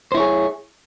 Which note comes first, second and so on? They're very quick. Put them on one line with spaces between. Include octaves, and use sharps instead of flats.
C5 E4 C#5 G#4